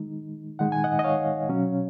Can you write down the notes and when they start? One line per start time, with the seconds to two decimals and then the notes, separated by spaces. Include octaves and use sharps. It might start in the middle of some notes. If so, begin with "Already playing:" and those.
Already playing: D#3 G#3 D#4
0.59 D#3 G#3 D#4 F#5
0.72 G#5
0.84 D#5 F#5
0.99 D#5
1.04 C#5 F5
1.49 B2 F#3 C#4